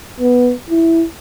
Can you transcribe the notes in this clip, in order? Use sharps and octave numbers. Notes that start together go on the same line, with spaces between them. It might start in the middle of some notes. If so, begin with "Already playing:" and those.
B3
E4